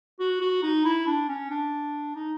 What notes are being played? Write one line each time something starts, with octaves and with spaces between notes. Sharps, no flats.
F#4
F#4
D#4
E4
D4
C#4
D4
D#4